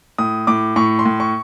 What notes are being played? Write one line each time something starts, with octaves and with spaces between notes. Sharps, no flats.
A2 D#6
A2 D6
A2 C#6
C6
A2
C#6